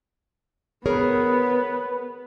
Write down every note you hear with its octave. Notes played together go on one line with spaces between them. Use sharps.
B3 G#4 A#4 B4 C#5